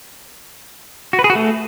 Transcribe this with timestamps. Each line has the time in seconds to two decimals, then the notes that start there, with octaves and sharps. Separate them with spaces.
1.13 F#4
1.19 B4
1.24 G#4
1.30 F#4
1.35 A3